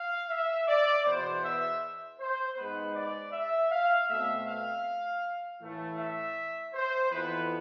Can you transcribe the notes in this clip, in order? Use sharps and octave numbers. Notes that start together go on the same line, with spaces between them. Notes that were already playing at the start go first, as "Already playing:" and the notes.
Already playing: F5
E5
D5
E2 B2 B3 C5
E5
C5
G#2 G#3 B3 B4
D5
E5
F5
B2 A3 C4 E5
F5
A2 E3 A3
E5
C5
F2 E3 B3 B4